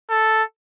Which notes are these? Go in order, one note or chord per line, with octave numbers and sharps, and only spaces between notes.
A4